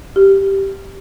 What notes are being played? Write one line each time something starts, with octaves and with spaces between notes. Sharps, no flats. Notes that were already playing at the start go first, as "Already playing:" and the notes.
G4